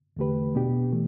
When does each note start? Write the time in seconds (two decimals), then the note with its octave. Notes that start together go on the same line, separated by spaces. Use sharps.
0.17 E2 D3 A3 G4 B4
0.55 B2 B3 D4 G4
0.92 E3 A3